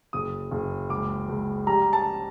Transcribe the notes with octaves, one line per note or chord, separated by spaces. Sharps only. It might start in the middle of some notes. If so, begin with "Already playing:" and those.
F#1 D#6
F#1
C#2 D6
C#2
G3 A#5
A5